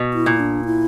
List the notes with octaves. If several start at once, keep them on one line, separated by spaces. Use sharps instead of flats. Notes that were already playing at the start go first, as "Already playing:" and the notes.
Already playing: B2
E4
A#2
D4
E4